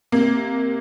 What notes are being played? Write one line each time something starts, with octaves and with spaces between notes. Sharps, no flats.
C3 A#3